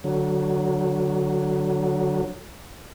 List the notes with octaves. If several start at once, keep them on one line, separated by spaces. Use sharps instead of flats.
D3 F#3